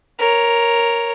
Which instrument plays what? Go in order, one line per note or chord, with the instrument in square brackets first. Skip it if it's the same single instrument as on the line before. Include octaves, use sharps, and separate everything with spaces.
[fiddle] A#4 C#5